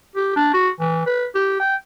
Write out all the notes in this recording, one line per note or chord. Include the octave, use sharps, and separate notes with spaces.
G4
D4
F#4
E3
B4
G4
G5